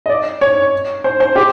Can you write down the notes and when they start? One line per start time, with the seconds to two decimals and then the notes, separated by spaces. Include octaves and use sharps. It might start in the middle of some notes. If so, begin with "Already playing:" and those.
0.06 D#5
0.09 D5
0.41 C#5
1.04 C5
1.20 C5
1.35 G4